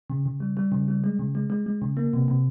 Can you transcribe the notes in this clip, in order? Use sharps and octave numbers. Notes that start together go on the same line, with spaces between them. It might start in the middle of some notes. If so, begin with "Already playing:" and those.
C#3
C#3
G3
G3
C#3
G3
G#3
C#3
G#3
G#3
G#3
C#3
A#3
C3
C3